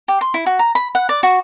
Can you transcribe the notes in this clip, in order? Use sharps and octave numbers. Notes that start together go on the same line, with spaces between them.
G4
C6
E4
F#4
A#5
B5
F#5
D5
F#4